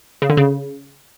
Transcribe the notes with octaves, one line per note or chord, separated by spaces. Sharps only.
C#3
D3
C#3